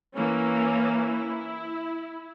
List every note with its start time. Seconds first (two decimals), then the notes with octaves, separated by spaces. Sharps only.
0.15 E3 A#3 C#4
0.94 E4